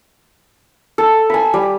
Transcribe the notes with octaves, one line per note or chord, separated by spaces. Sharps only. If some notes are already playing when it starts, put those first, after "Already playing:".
A4
G#5 B5
G3